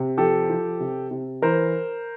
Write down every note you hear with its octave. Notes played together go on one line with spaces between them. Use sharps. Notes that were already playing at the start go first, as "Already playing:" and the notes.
Already playing: C3
F3 G4 A4
F3
C3
C3
E3 A#4 C5